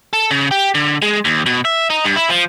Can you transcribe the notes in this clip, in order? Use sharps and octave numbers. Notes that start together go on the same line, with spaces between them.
A4
C#3
G4
D3
G#3
D#2
B2
E5
D#4
G2
E4
F3